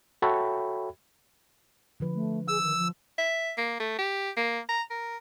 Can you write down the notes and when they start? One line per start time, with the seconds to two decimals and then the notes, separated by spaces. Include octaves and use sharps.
0.22 F#4 A4 C#5 E5 G5 B5
2.00 D3 F3 B4
2.14 A3
2.48 G#4 E6
2.61 D#3
2.77 F3
3.18 E5
3.58 A#3
3.80 A3
3.99 G4
4.37 A#3
4.69 A#5
4.90 A#4